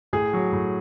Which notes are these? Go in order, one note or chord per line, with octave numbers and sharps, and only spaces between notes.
A2 G#4
F#3
A2